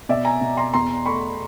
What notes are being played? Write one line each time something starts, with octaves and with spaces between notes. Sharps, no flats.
B2 D5 E5
G#5 A#5
B2
A#5 C6
E2 A#5 C6
A3 B5 C#6